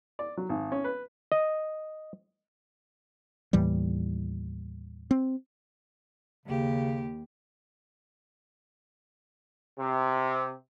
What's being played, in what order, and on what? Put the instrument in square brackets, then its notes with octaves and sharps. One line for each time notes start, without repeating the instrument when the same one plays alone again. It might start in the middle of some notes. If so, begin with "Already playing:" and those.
[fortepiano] D5
F#3
G#1
C#4
B4
[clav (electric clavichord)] D#5
[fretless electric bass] D#2 A2 E3 G3
C4
[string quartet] D#2 G4 [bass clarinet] C#3
[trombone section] C3